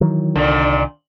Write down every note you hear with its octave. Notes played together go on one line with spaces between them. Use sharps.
D#3 E3 F#3
C2 A#2 D3 D#3